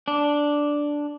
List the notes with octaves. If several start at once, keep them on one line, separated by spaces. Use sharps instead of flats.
D4